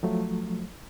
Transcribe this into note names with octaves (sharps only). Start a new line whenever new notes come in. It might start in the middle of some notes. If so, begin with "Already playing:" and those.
F3 F#3 A3